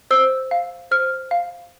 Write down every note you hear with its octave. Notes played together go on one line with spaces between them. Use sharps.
C5 E6
F5
C5 F6
F5